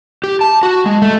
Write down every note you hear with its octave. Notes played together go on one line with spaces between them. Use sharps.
G4
A5
F#4
G#3
A3